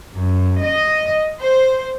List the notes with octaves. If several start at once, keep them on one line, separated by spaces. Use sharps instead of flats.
F#2
D#5
C5